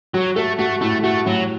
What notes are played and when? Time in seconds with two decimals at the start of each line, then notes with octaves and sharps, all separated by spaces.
0.14 F#3 F#4
0.36 A3 A4
0.58 A3 F#4
0.81 A2 A3
1.04 A3 F#4
1.26 A2 F#3